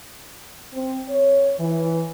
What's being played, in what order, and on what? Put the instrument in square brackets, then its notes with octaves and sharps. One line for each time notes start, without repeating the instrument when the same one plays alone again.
[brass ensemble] C4
C#5
E3